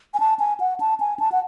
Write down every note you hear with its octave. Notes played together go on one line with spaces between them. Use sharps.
G#5
A5
G#5
F#5
A5
G#5
A5
F#5